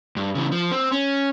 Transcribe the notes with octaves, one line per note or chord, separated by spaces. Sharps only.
G2
C#3 E3
F3
C4
C#4